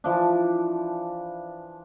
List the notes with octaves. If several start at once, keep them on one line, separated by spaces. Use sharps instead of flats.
E3 F3 D4